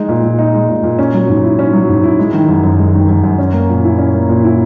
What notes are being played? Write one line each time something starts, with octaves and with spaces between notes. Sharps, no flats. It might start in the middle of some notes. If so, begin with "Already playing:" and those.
Already playing: G#3 D#4
A#2
A#2
D#4
G#3
A#2
A#2
C#4
F#3
G#2
E4
C#4
F#3
G#2
E4
G#3
D#3
F#2
F#2
G#3
D#3
F#2
F#2
C#4
A#3
A#2
E4
C#4
A#3
A#2
E4